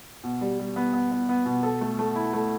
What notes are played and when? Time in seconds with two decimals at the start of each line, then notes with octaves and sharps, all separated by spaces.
0.24 B2
0.41 G3
0.59 G3
0.76 B3
0.93 B3
1.11 B3
1.29 B3
1.46 B2
1.63 A4
1.81 A3
1.99 A3
2.15 E4
2.33 A3